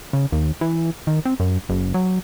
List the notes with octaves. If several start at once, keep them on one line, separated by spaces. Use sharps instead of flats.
C#3
D#2
E3
D#3
C4
F#2
F#1
F#3